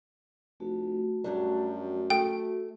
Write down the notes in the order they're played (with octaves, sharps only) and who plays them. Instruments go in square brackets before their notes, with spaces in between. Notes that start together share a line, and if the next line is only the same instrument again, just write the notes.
[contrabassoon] F1 [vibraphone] A3 F#4
[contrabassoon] F#2 [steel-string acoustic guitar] F#3 G3 D4
[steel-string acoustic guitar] A3 [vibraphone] F#4 [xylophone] G5